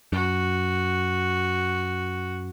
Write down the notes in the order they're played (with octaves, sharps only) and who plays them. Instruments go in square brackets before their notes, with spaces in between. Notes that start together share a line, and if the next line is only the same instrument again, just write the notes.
[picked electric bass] F#2 [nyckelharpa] F#4